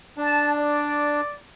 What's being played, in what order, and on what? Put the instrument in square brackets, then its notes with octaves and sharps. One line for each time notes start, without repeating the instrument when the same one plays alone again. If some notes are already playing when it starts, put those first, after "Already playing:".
[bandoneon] D4 [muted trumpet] A5
[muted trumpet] D5